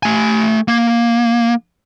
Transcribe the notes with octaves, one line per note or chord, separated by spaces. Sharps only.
A3 G#5
A#3